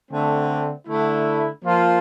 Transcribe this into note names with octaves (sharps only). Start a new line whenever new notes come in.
D3 A3 C4
D3 A3 E4
F3 A#3 F4